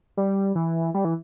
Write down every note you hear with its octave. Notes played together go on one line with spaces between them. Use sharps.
G3
E3
G3
E3